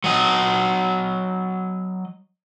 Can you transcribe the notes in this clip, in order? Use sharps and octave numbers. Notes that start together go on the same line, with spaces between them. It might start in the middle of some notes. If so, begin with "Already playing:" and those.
F#3 D#5